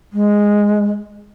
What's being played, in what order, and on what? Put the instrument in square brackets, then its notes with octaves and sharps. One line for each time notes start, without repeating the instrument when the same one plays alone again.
[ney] G#3